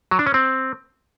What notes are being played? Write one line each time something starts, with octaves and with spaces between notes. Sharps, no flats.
F#3
D4
C#4
C4